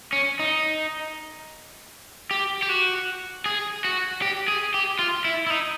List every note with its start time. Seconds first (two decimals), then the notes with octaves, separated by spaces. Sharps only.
0.13 C#4
0.39 D#4
2.31 G4
2.63 G4
2.69 F#4
3.46 G#4
3.85 F#4
4.22 G4
4.48 G#4
4.74 G4
4.99 F4
5.25 E4
5.47 E4
5.50 D#4